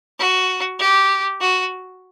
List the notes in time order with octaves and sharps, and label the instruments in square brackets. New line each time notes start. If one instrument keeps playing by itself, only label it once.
[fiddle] F#4
G4
F#4